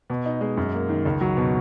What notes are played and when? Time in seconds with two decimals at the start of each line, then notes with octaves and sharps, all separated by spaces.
0.10 B2
0.26 D#4
0.41 G#3
0.57 F#2
0.73 A#3
0.89 D#3
1.05 C#2
1.21 F#3
1.37 B2